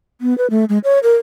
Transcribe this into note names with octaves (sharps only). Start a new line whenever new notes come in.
B3
B4
A3
G#3
C#5
A#4